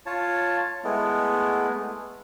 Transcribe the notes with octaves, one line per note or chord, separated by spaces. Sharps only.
F4 C#5 A5
G#3 A3 B3 E4